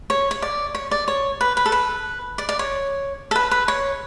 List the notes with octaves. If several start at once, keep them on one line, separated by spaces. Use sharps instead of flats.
C#5
C#5
D5
C#5
D5
C#5
B4
B4
A4
B4
D5
D5
C#5
A4
B4
B4
C#5